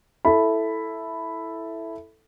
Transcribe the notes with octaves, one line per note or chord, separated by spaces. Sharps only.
E4 A4 B5